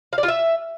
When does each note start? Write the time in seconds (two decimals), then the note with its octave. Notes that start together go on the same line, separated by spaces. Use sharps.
0.13 F5
0.18 D5
0.23 F4
0.28 E5